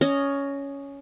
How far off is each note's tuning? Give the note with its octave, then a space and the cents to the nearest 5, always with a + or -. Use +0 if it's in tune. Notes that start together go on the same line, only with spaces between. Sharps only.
C#4 +10 D#5 -10